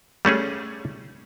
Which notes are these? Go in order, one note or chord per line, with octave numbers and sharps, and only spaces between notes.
G3 A3 C#4 G#4